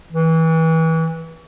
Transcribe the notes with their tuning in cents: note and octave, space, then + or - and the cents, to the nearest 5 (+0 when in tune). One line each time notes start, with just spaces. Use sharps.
E3 -25